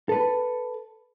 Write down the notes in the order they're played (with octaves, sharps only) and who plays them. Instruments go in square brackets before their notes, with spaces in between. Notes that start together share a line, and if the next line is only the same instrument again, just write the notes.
[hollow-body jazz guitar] A4 B4